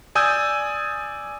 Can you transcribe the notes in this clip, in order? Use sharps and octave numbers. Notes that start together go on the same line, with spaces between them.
D5 G#5 D#6 E6 G6